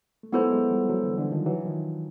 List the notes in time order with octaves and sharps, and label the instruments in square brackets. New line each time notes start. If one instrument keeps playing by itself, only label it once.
[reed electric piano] A3
[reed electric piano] F#3 G#3 [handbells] B3 E4 A4 C5
[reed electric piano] F#3 G#3
F3 G3
E3 F#3
D3 E3
D3 E3
D#3 F3
E3 F#3
D#3 F3